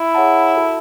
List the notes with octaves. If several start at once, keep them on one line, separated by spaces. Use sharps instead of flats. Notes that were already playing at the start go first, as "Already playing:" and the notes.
Already playing: E4
G#4 C#5 F#5 A5
F#4 A4 E5 A5